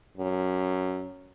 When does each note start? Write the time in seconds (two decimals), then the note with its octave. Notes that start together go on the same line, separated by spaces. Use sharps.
0.17 F#2